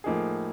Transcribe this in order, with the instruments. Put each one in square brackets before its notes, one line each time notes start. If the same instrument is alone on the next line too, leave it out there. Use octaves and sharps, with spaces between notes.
[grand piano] A2 F3 A#3 D#4 G#4